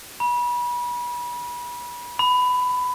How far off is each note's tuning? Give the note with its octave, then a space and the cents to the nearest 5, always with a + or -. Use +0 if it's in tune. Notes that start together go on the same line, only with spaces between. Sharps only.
B5 -30
B5 +15